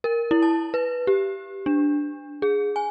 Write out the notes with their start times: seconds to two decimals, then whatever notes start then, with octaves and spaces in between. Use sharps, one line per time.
0.04 A#4
0.31 E4
0.42 A5
0.74 B4
1.07 G4
1.66 D4
2.42 G#4
2.76 G#5